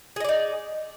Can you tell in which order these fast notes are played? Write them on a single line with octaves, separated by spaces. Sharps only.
G#4 D#5 D5 D#4